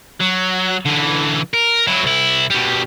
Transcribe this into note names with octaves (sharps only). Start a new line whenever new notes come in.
F#3
D3 E3
A#4
F#3 E4
C2 E4
B2 G3